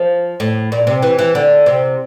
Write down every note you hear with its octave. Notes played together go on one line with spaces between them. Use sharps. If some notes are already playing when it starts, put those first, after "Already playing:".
Already playing: F3
A2
A#2
C3
E3
E3
D3
C3